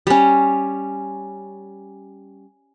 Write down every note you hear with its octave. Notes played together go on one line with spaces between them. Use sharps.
G3 C#4